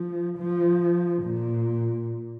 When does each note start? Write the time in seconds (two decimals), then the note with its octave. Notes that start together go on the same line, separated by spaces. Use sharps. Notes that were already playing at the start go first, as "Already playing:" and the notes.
Already playing: F3
0.38 F3
1.25 A#2